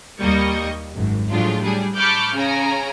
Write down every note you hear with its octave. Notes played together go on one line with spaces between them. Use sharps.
D#2 G3 A#3 D#5 C#6
G#1 F#2
A2 F3 F#3 G#3 D4 F4
G3 D4 G#4
A5 B5 C#6 D6 F6 G6
C#3 C#4 G#5 A#5